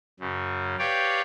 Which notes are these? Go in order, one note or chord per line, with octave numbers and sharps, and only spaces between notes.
F#2 C#3
G4 B4 C#5 D5 F5 G5